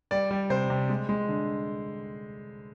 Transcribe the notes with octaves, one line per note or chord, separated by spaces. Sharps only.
G3 D5
G3
C3 C5
C3
G#3
G#3
D3